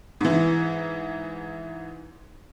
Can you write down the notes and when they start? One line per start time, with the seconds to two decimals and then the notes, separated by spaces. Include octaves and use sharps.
0.21 G#2 E3